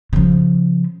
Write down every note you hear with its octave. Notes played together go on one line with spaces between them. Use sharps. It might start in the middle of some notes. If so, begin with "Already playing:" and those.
C#3 F3